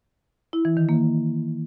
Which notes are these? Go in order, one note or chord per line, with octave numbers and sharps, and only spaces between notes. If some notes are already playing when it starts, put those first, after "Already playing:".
E4
E3
D#3
A#3